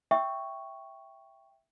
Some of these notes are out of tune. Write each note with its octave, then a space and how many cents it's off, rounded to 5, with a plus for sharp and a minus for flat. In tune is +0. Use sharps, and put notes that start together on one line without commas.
E5 +0 G5 +0 C#6 +0